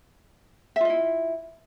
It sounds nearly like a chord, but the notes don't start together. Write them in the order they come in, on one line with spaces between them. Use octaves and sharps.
E5 F4 D#5 E4